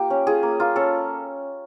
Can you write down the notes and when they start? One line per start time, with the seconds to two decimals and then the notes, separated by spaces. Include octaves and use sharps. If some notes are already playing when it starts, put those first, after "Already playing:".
Already playing: A#3 F4 G4
0.10 C#4
0.27 F4 G#4
0.43 A#3
0.60 A#3 F4
0.76 C#4 A4